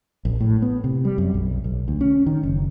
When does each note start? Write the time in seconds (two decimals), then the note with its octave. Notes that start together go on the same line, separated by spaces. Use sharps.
0.25 A#1
0.41 A2
0.62 B3
0.84 C3
1.05 G3
1.18 F#2
1.34 B1
1.64 B1
1.88 D2
2.01 C#4
2.26 D#3
2.43 F#1